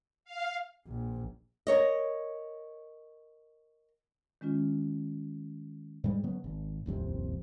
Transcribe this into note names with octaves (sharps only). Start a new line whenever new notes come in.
F5
A#1
A#4 C#5 D#5
D#3 G#3 C#4 F4
G#2 G3 G#3
C#3 F#3 B3
G#1
D#1 C2 F2 C3